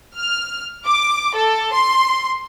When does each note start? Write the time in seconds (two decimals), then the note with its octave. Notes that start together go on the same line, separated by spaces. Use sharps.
0.15 F6
0.86 D6
1.35 A4
1.72 C6